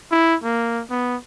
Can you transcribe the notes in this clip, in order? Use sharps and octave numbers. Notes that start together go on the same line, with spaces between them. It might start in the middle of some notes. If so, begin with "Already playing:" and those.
E4
A#3
B3